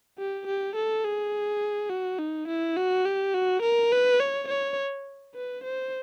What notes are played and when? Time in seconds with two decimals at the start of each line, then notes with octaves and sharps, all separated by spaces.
0.18 G4
0.47 G4
0.76 A4
1.04 G#4
1.90 F#4
2.19 D#4
2.48 E4
2.77 F#4
3.05 G4
3.34 F#4
3.62 A#4
3.92 B4
4.20 C#5
4.48 C#5
5.35 B4
5.64 C5